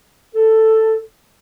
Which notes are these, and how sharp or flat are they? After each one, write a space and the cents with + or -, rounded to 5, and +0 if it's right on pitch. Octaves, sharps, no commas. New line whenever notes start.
A4 +5